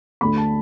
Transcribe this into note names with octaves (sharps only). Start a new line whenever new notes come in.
D2 D3 A3 B5
A5